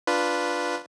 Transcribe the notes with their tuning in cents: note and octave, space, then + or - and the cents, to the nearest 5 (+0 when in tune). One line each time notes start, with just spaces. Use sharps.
D4 +0 F4 +0 B4 +0